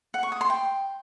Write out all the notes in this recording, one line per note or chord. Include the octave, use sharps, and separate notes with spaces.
F#5
C#6
D#6
C6
G5